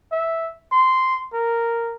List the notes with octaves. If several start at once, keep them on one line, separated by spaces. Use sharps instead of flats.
E5
C6
A#4